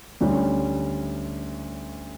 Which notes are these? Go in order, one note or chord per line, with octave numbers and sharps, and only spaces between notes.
D2 D3 G3 C#4